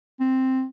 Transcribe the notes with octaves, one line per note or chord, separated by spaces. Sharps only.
C4